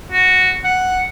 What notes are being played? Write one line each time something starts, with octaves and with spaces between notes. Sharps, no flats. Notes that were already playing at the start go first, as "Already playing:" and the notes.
F#4
F#5